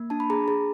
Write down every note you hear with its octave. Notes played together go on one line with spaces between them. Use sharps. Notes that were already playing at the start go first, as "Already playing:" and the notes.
Already playing: A#3
D4 A5
B5
G#4 A#5
G#4